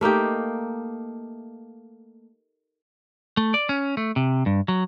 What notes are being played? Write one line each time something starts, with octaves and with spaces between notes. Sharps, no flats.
A3 A#3 D#4 G4
A3
D5
C#4
A3
C3
G2
F#3